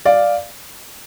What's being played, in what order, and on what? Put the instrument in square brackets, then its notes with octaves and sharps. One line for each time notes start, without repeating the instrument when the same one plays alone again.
[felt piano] D5 F5